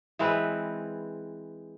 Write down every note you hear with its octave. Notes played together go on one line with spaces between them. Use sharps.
E3 G#3 C4 B4